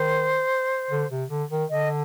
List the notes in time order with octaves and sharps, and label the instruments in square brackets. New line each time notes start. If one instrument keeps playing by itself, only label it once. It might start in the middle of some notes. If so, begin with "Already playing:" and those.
Already playing: [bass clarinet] D#3 [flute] C5
[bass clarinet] D3
C3
D3
D#3
[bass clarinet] D3 [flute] D#5